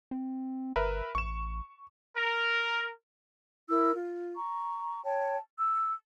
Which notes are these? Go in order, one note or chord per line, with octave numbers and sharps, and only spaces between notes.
C4
G1 A#4 B4 E5
A1 C#6 E7
A#4
E4 A#4 E6
F4
A#5 C#6
C#5 G5 A5
E6